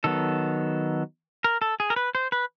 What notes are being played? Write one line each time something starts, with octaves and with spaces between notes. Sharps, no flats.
D#3 F#3 B3 A4
A#4
A4
G#4
A#4
B4
C5
B4